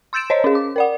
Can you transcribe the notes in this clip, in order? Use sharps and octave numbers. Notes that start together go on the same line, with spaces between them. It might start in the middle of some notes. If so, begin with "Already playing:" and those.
C6 E6 G6 A6 D7 E7
C5 C#5 D#5
C#4 G#4
D6
A#4 D5 F#5